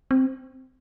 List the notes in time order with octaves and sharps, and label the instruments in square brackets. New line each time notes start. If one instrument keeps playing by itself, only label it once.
[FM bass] C4